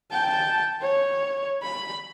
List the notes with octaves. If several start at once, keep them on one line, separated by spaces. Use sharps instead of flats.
G5 A5
C#5
B5